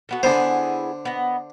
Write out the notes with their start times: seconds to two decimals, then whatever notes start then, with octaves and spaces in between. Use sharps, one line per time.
0.09 A3 B3 F#4
0.23 D3 B3 E4 G#4 C5
1.05 B3 D#5